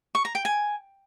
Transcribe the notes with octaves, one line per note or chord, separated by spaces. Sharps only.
C#6
A#5
G5
G#5